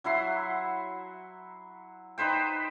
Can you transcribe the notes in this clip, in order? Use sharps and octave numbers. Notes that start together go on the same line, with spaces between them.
F#3 E4 F#5 C6
D#4 B4 C5 G5